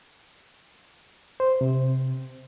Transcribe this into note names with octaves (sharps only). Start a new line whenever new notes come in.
C5
C3